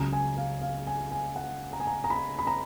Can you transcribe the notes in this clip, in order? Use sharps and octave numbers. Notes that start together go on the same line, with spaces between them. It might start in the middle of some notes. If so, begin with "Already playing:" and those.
Already playing: C#2 C#3 F#3 A#5
G#5
F5
F5
G#5
G#5
F#5
A#5
G#5
A#5
A#5
B5
B5
A#5